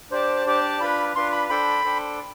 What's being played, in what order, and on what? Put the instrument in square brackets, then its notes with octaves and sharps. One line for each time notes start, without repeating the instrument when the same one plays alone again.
[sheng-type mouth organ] D4 G4 D5 A5 [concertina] C5
[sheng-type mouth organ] D4 G4 D5 A5
[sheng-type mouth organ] D4 F4 B4 [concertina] B5
[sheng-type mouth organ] D4 F4 B4 [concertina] C6
[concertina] B5
[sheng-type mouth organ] D4 A4 C5 G5 [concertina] B5
[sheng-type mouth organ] D4 A4 C5 G5